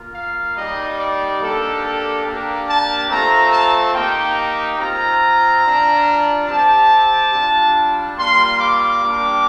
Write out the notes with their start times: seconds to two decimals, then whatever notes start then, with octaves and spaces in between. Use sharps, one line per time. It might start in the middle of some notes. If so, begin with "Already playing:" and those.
Already playing: A#3 F4
0.15 F5
0.56 G3 A#3 D#4 G4 D#5
0.99 D5
1.41 A#3 D4 G4 A4
1.83 A4
2.25 A#3 D4 G4
2.68 A5
3.09 A3 C4 F4 A#5
3.52 A5
3.94 A#3 D#4 G4 G5
4.79 C4 F4 A#5
5.64 G3 D4 F4
6.47 C4 G4 A5
7.32 G3 D4 F4
8.17 G3 A#3 F4 C6
8.58 D6
9.01 G3 A#3 D4 G4